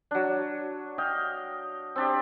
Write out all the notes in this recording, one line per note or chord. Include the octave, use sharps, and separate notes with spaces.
F#3 D4
D#5 F5 G5
C4 D4 G4